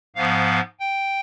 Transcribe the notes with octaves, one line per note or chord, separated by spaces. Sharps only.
G#2 F3 B3 F5
G5